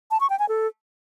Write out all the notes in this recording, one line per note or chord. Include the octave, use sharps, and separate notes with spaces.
A5
C#6
G5
G#5
A4